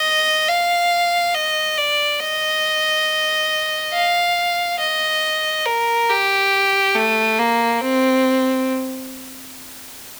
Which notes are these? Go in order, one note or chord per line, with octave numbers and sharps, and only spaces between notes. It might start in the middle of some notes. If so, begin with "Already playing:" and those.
Already playing: D#5
F5
D#5
D5
D#5
F5
D#5
A#4
G4
A3
A#3
C4